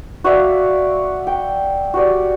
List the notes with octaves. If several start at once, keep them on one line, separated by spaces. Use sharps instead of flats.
F#4 D5 E5 F5
G5
F#4 G4 D5